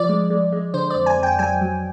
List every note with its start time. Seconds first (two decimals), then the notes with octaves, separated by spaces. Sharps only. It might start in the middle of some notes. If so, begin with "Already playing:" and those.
Already playing: F3 D5
0.09 G#3
0.30 G#3
0.52 G#3
0.74 D3 C5
0.90 D5
0.95 F2
1.06 G#5
1.17 F2
1.23 G5
1.39 F#3 G#5
1.61 F#3